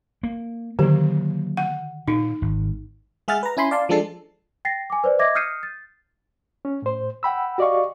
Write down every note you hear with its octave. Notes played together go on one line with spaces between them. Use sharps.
A#3
D3 D#3 F#3 A#3 G4
F#5
A#2 D#4
G#1
G#3 G#4 E5 F#5 F6 A6
B4 A#5
C#4 E4 G#5 B5 C6
D5 F5 A5 C6
F3 G#3 D4 A4 A6 C7
G5 A6 A#6 C7
G#5 D6
B4 C5 D5
D#5 E5 D6 G#6 A#6
D#6 F6 G6 C7 C#7 D#7
A6
C#4
A2 C5
F#5 G5 B5 E6
F#4 G4 D5 D#5 F5 C#6